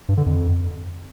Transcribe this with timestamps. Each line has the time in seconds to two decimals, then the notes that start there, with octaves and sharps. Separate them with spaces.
0.09 G2
0.17 D3
0.26 F2